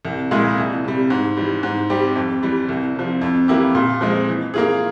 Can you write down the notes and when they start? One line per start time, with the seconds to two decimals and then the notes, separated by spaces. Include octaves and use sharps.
0.05 C2
0.31 A#2 G#3 E4 G#4
0.58 C2
0.84 C3 G3
1.10 G#2
1.37 E3 G3
1.63 G#2
1.90 G3 C4 G4
2.16 F2
2.42 E3 G3
2.69 C2
2.96 C3 F3
3.22 F2
3.48 E3 A#3 E4 G4
3.75 A#2
4.01 F3 G#3 C4
4.27 E3
4.54 A#3 F4 G#4